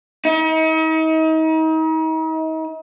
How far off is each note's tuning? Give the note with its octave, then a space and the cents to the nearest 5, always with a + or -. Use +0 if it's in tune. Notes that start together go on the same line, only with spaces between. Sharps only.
D#4 +40